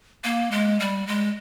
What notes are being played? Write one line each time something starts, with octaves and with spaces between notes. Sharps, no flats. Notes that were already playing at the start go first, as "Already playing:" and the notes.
A#3
G#3
G3
G#3